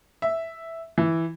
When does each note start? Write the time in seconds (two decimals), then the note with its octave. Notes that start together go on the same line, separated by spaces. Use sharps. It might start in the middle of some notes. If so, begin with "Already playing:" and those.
0.22 E5
0.98 E3